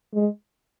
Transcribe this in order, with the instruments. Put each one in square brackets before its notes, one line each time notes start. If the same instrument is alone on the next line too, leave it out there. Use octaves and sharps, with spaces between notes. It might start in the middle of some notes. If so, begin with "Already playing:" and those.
[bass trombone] G#3